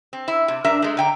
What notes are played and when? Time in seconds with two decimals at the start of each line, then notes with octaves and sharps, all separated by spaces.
0.13 C4
0.28 E4
0.48 C3
0.65 G2 D4 A#4 E5
0.82 G#3 A3
0.97 D3 G5 A#5